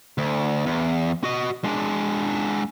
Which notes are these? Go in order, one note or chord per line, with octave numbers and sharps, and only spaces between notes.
D2
E2
F#4 D#5
G#3 D4